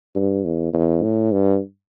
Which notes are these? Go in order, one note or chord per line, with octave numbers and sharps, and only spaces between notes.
G2
E2
E2
A2
G2